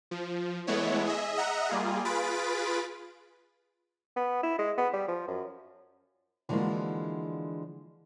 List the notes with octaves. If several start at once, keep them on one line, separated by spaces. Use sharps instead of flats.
F3
E3 G#3 A3 B3 E4 C#5
G#4 D#5 E5
D#5 E5 F#5 A#5
G3 A#3 F4 G#4
F4 G#4 B4 A6 B6 D7
B3
E4
G#3
B3
G3
F3
F#2
D3 E3 F3 G#3 A#3 F#4